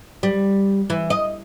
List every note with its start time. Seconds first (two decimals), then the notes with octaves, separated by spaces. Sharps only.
0.23 G3
0.90 E3
1.10 D#5